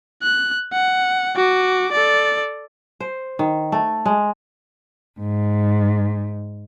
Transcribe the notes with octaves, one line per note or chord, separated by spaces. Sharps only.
F#6
F#5
F#4 D6
A4 D5
C5
D#3
A3
G#3
G#2